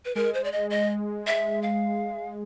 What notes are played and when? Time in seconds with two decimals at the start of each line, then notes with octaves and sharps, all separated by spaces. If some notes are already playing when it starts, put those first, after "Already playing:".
0.05 B4
0.15 G#3 A#4
0.34 C5
0.44 D5
0.52 D#5
0.70 D#5
1.27 E5
1.63 F5